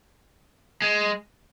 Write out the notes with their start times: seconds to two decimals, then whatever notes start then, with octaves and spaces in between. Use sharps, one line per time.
0.82 G#3